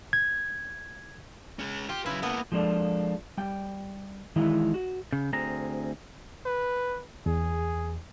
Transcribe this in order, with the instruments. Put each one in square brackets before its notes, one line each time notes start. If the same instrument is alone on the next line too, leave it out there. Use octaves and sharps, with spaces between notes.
[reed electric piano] G#6
[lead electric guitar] G#3 C#4
[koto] F4 [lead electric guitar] G4
[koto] C#3 E4 [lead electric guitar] F#3 B4
[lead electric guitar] A#3 A4 [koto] B3
[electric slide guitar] F3 G#3 A#3 D4 A4
G3 G5
D#3 E3 G#3 D#4 E4
F#4
[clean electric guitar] C#3
D2 C4 G#4 A#5
[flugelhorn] B4
[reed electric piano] E2 [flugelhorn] G#4